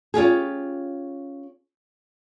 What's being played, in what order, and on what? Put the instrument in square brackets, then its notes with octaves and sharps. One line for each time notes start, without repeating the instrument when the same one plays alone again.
[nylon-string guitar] C#4 F4 G4 G#4